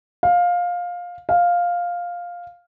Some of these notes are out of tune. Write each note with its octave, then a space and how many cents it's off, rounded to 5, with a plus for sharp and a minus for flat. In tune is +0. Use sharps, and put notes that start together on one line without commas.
F5 +15
F5 +5